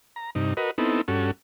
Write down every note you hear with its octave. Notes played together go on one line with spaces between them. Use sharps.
A#5
G2 C3 D#4
F#4 A#4 B4 D#5
B3 C4 D#4 E4 A4
G2 C#4 F#4 A4